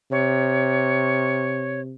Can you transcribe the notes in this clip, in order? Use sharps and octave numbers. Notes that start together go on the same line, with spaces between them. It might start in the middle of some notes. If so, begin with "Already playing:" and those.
C3 C#5